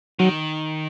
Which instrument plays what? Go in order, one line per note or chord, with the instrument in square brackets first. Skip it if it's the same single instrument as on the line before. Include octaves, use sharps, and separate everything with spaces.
[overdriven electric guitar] D#3 [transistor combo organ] F#3